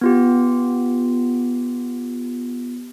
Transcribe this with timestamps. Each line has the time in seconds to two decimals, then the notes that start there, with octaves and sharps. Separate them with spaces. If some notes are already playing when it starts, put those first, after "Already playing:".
0.01 B3 F4 G4